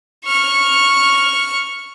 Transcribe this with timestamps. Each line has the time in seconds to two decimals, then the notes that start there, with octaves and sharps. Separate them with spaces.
0.25 C#6 F6